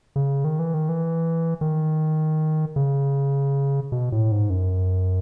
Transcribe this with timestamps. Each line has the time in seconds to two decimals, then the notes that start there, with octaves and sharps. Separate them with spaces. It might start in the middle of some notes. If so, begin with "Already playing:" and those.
0.16 C#3
0.44 D#3
0.59 E3
0.74 D#3
0.89 E3
1.61 D#3
2.76 C#3
3.92 B2
4.12 A2
4.32 G#2
4.50 F#2